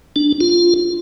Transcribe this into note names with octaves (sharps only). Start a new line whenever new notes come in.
D4
F4